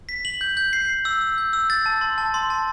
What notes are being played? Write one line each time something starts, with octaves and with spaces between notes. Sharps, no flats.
B6
F#7
G6
G6
C7
C7
E6
E6
G6
E6
A6
A5
C6
A5
C6
A5